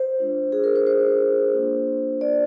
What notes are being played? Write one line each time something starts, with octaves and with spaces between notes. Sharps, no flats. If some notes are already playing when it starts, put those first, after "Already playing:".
Already playing: C5
G#3 D4 F4
G#4
A#4
C5
C5
A#3 D4 F4
D5